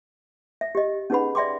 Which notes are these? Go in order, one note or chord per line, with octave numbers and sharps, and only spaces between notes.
E5
G4 D#5
C#4 D#4 G#4 B4 F#5 B5
D5 E5 G5 C6 D6